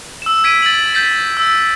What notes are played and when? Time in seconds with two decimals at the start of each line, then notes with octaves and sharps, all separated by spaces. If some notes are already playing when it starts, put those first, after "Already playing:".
0.22 E6 E7
0.44 G#6 B6 D7 D#7
0.62 A6 D7 D#7 F#7
0.95 G6 A6 B6
1.37 E6